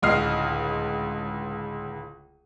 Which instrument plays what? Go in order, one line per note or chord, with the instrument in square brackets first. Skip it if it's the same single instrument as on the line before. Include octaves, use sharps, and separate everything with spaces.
[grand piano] D1 C#2 D#5 F6 C7